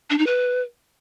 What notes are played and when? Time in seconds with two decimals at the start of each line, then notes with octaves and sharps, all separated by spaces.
0.10 D4
0.18 D#4
0.27 B4